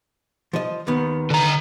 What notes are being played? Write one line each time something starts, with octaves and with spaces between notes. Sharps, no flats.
F3 D#5
D#2 D#3 B3
D3 A#5